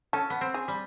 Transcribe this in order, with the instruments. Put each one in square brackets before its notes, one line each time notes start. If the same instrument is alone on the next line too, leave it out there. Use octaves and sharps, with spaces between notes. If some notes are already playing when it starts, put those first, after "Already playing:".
[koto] C#4 [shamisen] A4
[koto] B3
C4
[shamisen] G#4
[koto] G3